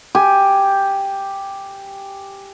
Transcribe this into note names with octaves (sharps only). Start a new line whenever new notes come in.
G4 G#5